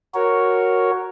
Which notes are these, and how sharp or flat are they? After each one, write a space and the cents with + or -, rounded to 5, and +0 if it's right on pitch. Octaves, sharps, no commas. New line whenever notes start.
F#4 +0 A#4 +0 C#5 +0